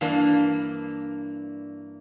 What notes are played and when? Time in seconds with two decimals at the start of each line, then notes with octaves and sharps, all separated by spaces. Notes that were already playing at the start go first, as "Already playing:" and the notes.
0.01 G2 E3 A#3 D4